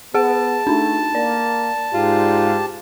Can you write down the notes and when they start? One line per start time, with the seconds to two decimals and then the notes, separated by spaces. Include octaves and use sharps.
0.14 B3 G#4 F#5 A5
0.67 A3 D4 D#4
1.15 A#3 D5
1.93 G#2 F4 G4